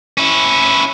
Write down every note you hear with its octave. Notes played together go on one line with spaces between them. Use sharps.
C#4 E4